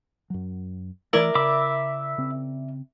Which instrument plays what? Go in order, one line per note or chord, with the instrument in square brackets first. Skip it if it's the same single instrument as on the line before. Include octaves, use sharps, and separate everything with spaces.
[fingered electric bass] F#2 F#3
[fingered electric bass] E3 A3 [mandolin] E4 A#4 D5
[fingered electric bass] C#3 [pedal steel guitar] E5 B5 D6
[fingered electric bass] C#3 C4